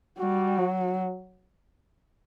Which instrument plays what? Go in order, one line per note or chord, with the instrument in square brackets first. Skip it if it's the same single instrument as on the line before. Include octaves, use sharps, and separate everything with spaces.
[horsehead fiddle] G3 [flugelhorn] F#4
[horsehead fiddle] F#3